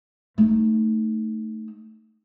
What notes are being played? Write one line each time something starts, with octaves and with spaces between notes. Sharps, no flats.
A3 D#4